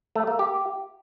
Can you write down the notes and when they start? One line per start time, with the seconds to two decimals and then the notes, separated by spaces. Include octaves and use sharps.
0.15 A3
0.27 A#3
0.39 G4